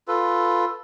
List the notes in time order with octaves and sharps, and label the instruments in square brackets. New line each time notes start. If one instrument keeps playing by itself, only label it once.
[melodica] F4 A4 B4